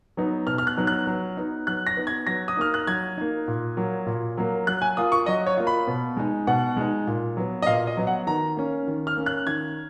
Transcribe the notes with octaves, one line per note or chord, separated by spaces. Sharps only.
F#3 B3 D#4
B2 F6
F6
F#6
F#3 B3 D#4
F#6
F#3
B3 D#4
F#3 F#6
A#6
B3 D#4
G#6
F#3 A#6
D#6
A#3 D#4 F6
F#6
F#3 G#6
A#3 D#4
A#2
F#3 A#3
A#2
F#3 A#3
F#3 F#6
G#5
A#3 F4 D#6
C#6
F#3 D#5
C#5
A#3 F4
B5
B2
G#3 D#4
B2 F#5
G#3 D#4
A#2
F#3 B3
D#5
A#2 F5
D#5
F#3 B3
F#5
D#3 A#5
A#3 C#4
D#3
F6
A#3 C#4
F#6
D#3 G#6